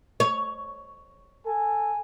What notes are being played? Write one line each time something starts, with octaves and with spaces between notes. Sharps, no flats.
C#5
A4 G#5